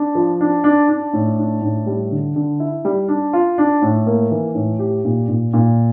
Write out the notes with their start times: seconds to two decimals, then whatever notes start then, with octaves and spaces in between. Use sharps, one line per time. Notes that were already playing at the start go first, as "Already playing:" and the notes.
Already playing: D4
0.15 F3
0.41 D4
0.64 D4
0.89 D4
1.13 A2
1.38 D4
1.62 A2
1.87 G3
2.11 D3
2.36 D3
2.60 E4
2.85 G3
3.08 D4
3.33 F4
3.58 D4
3.82 A2
4.06 A#3
4.31 E3
4.55 A2
4.79 G4
5.05 A#2
5.28 A#2
5.53 A#2